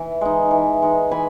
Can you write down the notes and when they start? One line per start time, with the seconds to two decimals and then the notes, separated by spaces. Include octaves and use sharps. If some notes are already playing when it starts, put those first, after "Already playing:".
Already playing: E3
0.21 G#3 D#4
0.51 E3
0.82 G#3 D#4
1.11 E3 G#5 B5